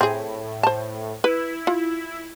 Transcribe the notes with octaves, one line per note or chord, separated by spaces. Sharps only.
A2 C4 G#4
C5 A5
E4 B4
F4